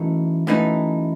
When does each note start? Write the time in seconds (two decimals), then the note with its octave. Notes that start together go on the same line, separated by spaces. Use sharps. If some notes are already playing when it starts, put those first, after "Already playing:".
Already playing: F#2 E3 A3 D#4
0.47 F#2 E3 A3 D#4